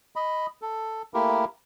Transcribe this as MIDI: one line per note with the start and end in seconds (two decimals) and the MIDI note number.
0.16 0.46 75
0.16 0.46 83
0.62 1.02 69
1.14 1.45 57
1.14 1.45 58
1.14 1.45 64
1.14 1.45 67
1.14 1.45 70